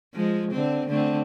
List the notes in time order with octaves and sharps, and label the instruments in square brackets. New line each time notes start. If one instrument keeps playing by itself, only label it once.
[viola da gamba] F3 G#3
D3 C4
D3 A3 C4